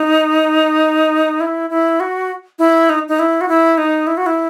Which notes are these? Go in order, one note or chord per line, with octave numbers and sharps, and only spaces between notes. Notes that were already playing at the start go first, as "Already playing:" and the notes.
Already playing: D#4
E4
E4
F#4
E4
D#4
D#4
E4
F#4
E4
D#4
E4
F#4
E4